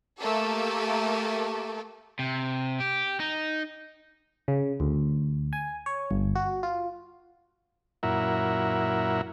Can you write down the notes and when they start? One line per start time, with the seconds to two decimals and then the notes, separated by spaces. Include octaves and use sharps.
0.18 A3 A#3 G4 A4
2.19 C3
2.80 G4
3.20 D#4
4.48 C#3
4.80 D2
5.53 G#5
5.86 C#5
6.11 G1
6.36 F#4
6.63 F4
8.03 F#2 A#2 E4 A#4 E5 F#5